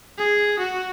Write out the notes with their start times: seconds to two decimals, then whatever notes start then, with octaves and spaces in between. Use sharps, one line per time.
0.18 G#4
0.59 F#4